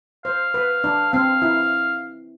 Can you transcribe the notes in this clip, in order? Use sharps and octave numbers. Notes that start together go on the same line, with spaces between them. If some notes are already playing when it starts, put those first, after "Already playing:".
C5 F5
B4
D4
C4 F5
E4